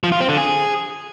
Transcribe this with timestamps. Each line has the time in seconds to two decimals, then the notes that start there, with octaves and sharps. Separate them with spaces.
0.04 F3
0.12 F4
0.20 C4
0.29 D3
0.37 G#4